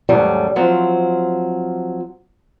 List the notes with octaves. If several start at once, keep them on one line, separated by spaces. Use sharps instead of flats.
D#2 G#2 F#3 G3 A3 C#4
F3 F#3 C4